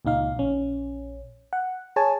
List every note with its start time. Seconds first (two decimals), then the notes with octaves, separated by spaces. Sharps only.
0.05 C#2 A#2 D#4 F5
0.37 A#1 C#4
1.53 F#5
1.96 G#4 C#5 G#5 A5